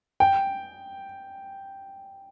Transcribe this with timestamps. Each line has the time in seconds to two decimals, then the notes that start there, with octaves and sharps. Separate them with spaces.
0.20 G5